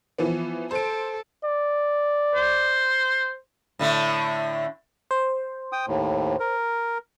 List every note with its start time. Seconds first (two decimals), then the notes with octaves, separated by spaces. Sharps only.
0.18 E3 F3 B3
0.71 A4 C5 D7
1.44 D5
2.35 C5
3.79 A2 D3 A3
5.11 C5
5.72 G5 D#6
5.88 D#2 A2
6.40 A#4